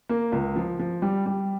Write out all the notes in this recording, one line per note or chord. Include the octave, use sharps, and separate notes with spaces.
A#3
C#2
F3
F3
G3
G3